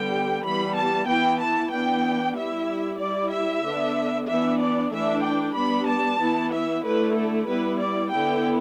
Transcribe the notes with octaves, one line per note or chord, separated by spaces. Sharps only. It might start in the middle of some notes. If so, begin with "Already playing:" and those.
Already playing: D3 G3 B3 G5
E3 G3 B3 B5
A5
E3 B3 E4 G5
A5
E3 B3 D4 G5
G3 E4 E5
G3 E4 D5
E5
D3 B3 D4
E3 B3 D4 E5
D5
E3 A3 D4 E5
G5
G3 B3 D4 B5
A5
E3 B3 E4
E5
D3 A3 E4 B4
A4
G3 B3 E4 B4
D5
D3 B3 E4 G5